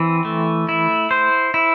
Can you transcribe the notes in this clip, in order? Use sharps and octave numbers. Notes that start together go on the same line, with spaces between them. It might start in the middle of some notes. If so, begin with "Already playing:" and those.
Already playing: E3 C4
A3
E4
C5
E4